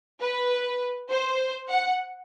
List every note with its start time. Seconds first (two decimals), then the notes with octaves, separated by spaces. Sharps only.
0.22 B4
1.10 C5
1.69 F#5